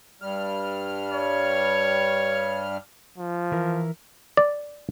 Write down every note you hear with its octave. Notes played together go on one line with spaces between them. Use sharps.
G2 G3 F6
C#5
F3
E3 E4 A#4
D5